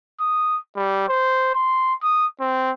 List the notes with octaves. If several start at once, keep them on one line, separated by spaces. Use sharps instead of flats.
D#6
G3
C5
C6
D#6
C4